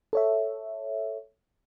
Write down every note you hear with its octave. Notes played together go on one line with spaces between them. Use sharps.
A4 C#5 E5